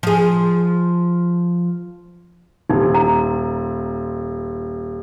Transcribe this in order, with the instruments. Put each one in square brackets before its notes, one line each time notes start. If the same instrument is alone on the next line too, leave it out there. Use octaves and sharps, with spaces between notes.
[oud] F3 G#4
[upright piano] D#1 [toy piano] D#4
[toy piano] D#4 A#5